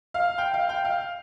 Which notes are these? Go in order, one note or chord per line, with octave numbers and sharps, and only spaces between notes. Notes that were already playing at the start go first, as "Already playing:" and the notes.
F5
G5
F5
G5
F5